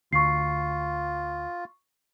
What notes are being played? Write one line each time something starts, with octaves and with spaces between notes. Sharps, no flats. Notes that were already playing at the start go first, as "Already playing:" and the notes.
D2 F4 C#6 C7